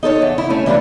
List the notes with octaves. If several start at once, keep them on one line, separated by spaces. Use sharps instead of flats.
D#4 A4 C5 C#5
E2
E4
A3 C#4
E3 G3 D4 F4 B4